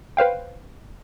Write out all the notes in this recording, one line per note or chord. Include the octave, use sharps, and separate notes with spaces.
B4 C5 F5 G5